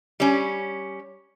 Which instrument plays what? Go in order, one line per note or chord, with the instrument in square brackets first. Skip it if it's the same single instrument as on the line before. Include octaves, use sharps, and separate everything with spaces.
[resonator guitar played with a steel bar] G3 C#4